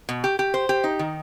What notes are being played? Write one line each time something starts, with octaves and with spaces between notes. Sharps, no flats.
B2
G4
G4
C5
G4
D#4
D#3